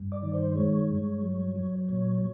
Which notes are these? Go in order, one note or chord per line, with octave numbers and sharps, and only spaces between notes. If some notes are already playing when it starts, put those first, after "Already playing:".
Already playing: G2
D5
D#3
C5
G#3 C#5
G2
F#3
F#3
A#2 C#5